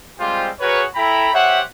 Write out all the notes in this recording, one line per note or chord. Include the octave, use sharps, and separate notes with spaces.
G3 G#3 C4 F4 G4 C5
F#4 G#4 A#4 B4 C#5
E4 A4 G5 A#5 B5
G4 C5 C#5 E5 F#5